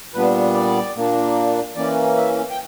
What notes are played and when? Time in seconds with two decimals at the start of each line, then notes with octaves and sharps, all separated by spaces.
0.14 A#2 G3 B3 D4 B4
0.55 D5
0.95 A#2 A#3 D4
1.76 E3 A#3 C#4 D5
2.17 E5
2.50 G5